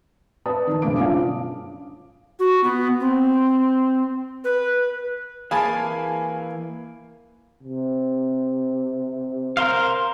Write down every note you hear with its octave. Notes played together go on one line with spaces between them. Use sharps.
B4 D5 A5 D#6
D#3
F#1 G2 B2 D3 D6 D7
C#4 D4 F4 F5
F#4
B3
C4
B4
E3 A#3 G#4 F5 G#5 A5 B5
C3
A#4 C5 F5